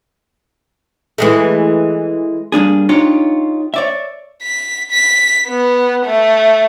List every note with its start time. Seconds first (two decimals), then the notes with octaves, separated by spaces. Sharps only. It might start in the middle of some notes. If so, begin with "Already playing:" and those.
1.18 E3 G#3 A3
2.52 G3 A#3 D4 G#4
2.89 D4 D#4 F4 G4 C#5
3.74 C#5 D5 E5
4.43 B6
4.91 B6
5.48 B3
6.05 A3